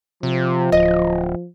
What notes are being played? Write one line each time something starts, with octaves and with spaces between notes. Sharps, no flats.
C3 F3
D1 D#5